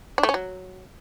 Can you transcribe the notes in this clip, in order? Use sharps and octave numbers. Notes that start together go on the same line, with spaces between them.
D4
A3
C#4
F#3